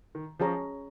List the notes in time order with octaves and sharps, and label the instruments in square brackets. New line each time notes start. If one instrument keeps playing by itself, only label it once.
[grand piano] D#3
[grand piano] F3 [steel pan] C#4 G#4 C#5 A#5